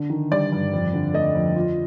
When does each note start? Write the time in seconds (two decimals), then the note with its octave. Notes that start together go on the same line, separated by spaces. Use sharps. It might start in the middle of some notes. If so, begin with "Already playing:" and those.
Already playing: D3 D4
0.10 D#3
0.31 G3 D5
0.52 G2
0.73 F2
0.93 D3
1.14 A3 D#5
1.35 F2
1.56 F4